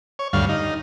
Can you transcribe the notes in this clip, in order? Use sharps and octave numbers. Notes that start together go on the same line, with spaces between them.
C#5
D2 G2 F5
D#4